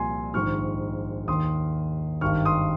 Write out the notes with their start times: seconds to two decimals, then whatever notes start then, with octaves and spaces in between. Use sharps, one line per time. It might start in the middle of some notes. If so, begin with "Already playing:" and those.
Already playing: C2 A#2 F3 G#5 C6
0.34 A#1 G#2 D#3 C#6 F6
1.28 D#2 D#3 C6 D#6
2.21 G#1 G2 D#3 C#6 F6
2.45 C6 D#6